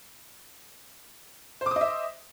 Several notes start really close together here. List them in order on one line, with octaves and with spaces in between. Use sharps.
C5 D6 D#6 D#5 E5